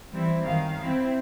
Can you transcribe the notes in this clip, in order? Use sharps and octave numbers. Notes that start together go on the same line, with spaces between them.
E3 G3 C4 E4
F#2 D#3 F5
C4 E4